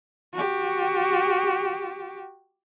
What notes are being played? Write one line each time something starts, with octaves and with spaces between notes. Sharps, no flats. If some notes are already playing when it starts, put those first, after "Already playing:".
F#4 G4